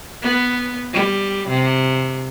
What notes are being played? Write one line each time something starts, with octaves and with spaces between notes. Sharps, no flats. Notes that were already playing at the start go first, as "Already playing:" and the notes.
B3
G3
C3